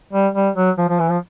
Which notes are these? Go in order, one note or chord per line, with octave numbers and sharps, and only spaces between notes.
G3
G3
F#3
F3
F3
E3
F3